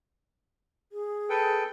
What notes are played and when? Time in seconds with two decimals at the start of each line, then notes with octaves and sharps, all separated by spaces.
0.92 G#4
1.30 A4 B4 G5